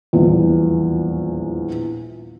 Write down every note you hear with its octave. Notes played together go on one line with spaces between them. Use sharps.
D#1 A#1 E2